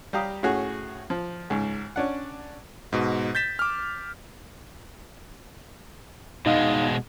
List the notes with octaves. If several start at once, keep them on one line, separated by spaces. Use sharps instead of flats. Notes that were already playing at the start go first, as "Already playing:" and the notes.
G3 G4 F5 A#5 D#6
A2 C#4 F#4 G#4
F3
C#2 G#2
C#4 D4 F#5
G#2 B2
G6 A6 B6 E7
D6 F6
B2 G#3 D#4 D#5 F5